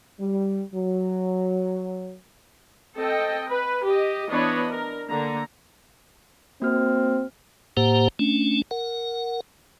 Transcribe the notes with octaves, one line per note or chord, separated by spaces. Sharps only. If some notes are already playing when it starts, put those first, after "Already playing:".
G3
F#3
C4 A4 D#5 G5
B4
G4 D#5
E3 B3 D4 C#5 D#5 B5
A#4
D3 A#3 A#5
A#3 C4 F#4 F6
A2 A#3 G4 C5 F#5 A#5
A3 C#4 D4
A#4 F#5